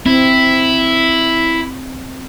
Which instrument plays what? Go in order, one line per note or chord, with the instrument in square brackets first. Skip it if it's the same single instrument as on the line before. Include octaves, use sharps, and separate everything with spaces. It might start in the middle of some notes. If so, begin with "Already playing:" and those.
[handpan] C4 [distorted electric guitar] E4